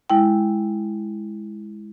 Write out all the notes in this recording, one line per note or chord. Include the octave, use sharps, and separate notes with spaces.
G#3 E4 G5